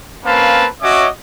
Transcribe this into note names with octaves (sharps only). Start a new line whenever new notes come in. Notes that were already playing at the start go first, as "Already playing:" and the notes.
A#3 C4 C#4 B4 F5 A5
C#4 F#4 C#5 D#5 E5 D6